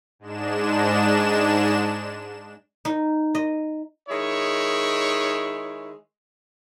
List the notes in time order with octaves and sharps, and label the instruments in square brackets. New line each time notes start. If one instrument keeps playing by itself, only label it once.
[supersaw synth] G#2 G#3 D4 E7
[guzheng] D#4
D#5
[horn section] D#3 G#3 E4 C#5